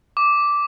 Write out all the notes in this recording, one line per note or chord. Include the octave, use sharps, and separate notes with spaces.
D6